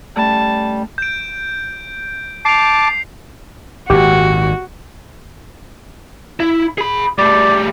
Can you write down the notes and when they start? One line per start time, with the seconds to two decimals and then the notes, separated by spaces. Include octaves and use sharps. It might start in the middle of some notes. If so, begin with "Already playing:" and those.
0.16 G3 A3 C#4 A5
0.98 G6 D7
2.45 A5 D6 C7 F7
3.90 G#1 A#2 F#4 G4
6.40 E4
6.78 G#4 B5
7.19 G3 A3 D5